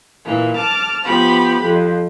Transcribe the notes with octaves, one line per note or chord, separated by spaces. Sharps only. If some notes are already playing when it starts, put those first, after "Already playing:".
A#2 E3 A#3
A5 D6 F6
F3 B3 G4 B5
F2 F3